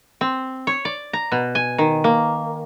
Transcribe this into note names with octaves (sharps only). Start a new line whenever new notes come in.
C4
C#5
D5
A#5
B2
G#5
D#3
A#3